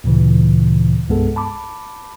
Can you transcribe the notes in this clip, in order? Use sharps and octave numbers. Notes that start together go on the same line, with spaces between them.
D2 A#2 C#3 E3
C2 G2 G#3 B3 G#4 A4
A5 B5 D6